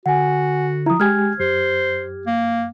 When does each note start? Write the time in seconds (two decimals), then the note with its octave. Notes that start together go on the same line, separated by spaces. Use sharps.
0.06 D3 F#4 F#5 G#5
0.86 F3 E4 A#5 D#6
1.00 G#3 G4 G#5 F6 G#6
1.40 F#2 G4 C5
2.27 A#3